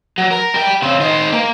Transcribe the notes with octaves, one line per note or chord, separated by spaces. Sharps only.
F#3
A#4
G3 G5
C#3 C4
D#3 C5
A#3